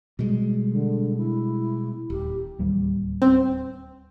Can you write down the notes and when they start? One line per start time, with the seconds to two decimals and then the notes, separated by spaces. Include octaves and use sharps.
0.19 B2 G3 G#3
0.69 D3
1.17 E4
2.10 D#1 G4
2.59 D1 D#2 G3
3.22 C4